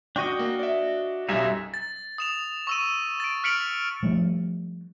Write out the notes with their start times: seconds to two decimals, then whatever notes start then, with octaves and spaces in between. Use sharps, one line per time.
0.16 D4 F#4 D#5 G5 C#6 D#7
0.39 A#3
0.59 D5 E5
1.29 B1 F#2 G3 D#4 E5 G#5
1.74 A6
2.18 D#6 E7 F7
2.67 C#6 E6 D#7
3.20 A6 D7
3.44 F6 B6 C#7 D7 F7 F#7
4.03 F3 G3 A3 D4